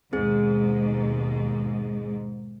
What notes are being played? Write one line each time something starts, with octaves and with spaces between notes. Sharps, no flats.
D#2 G#2 B2 C4 G#4